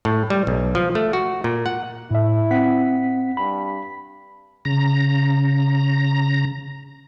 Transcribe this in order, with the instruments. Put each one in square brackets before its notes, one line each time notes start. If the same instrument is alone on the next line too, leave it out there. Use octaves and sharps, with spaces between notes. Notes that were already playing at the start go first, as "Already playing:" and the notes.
[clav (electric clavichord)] A2
G3
B1
F3
A3
F#4
A#2
F#5
[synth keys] A2 E5 [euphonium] E4
[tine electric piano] C4 F#5 [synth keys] B6
[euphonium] G2 [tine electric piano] B5
[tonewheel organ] C#3 A#5